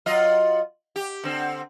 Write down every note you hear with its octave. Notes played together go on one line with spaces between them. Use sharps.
F#3 F4 D#5
G4
D3 C4